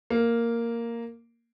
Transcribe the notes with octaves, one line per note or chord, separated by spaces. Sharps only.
A#3